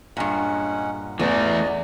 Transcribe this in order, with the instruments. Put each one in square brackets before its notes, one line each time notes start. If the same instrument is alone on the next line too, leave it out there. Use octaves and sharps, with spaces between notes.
[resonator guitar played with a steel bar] G2 A#2 [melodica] G#3 C#4 F#5
[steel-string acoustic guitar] E2 [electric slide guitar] E3 A3 [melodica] F#4 D5 D#5